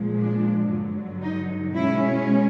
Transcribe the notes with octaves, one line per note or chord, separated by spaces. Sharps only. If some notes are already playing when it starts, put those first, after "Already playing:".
Already playing: A#2 F3 G#3
D4
G2 D3 F#3
D#4
B2 G#3 C#4 E4